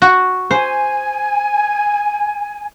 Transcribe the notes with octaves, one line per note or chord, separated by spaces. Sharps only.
F#4
C5 G#5